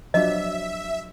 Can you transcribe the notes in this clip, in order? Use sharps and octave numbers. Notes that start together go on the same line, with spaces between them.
F3 F#3 D4 D#5 E5